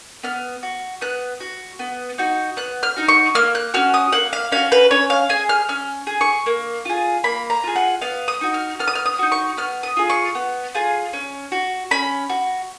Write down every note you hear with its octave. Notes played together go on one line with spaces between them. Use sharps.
B3 F6
F#4
B3 F#6
F#4
B3
D#4 F#4
B3 F#6
F6
D#4 F#4
C#6
A#3 F6
F#6
C#4 F#4 F6
D#6
A#3 F#5
F5
C#4 F#4 F5
B4
C#4 C#5
F5
G#4 G#5
F6
C#4 F6
G#4
C#6
A#3
F4 G#4
A#3 B5
A#5
F4 G#4
F#5
B3 F5
D#6
D#4 F#4
F6
B3 F6
D#6
F6
D#6
D#4 F#4
C#6
B3 F6
D#6
F4 G#4
C#6
B3
F4 G#4
C#4
F#4
C#4 B5
F#4